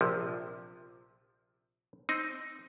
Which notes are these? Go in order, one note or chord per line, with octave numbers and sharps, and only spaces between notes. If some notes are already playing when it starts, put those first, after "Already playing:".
A#1 C3 F3
C4 D#4